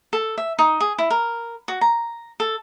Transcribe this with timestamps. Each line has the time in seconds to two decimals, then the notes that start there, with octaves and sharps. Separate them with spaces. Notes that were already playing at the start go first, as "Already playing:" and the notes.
0.13 A4
0.38 E5
0.59 D#4
0.80 G#4
0.98 E4
1.10 A#4
1.68 F#4
1.81 A#5
2.40 A4